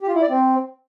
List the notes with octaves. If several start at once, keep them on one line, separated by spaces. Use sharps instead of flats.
G4
F4
E4
D5
C4